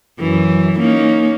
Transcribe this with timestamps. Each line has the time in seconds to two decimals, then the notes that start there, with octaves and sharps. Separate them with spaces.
0.19 F#2 E3
0.79 A#3 C#4 D#4